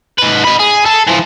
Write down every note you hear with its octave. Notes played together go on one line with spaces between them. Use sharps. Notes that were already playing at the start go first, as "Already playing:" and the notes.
G#2 B4
D#5 B5
G#4
A4
E3 F3